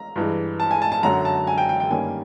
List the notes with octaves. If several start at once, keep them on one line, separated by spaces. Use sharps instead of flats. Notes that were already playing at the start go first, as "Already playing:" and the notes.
Already playing: A#5
G2 E3 G#3
A5
G#5
A5
A5
F#2 D3 F#3 A#5
A5
G#5
G5
G5
G5
G2 D#3 G3 A#3 C#4 G#5